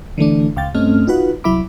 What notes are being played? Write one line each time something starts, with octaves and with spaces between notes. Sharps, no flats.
D3 E3 A3 D4
C#2 F5 G5 A6
G2 A3 C4 C#4 D#5 F6
D#4 F4 F#4 B4 F#5
C2 F#3 E4 E5 B5 D6